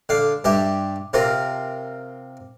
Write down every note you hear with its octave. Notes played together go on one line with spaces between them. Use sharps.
D3 F5
G2 G4 E5
C3 C4 F4 A#4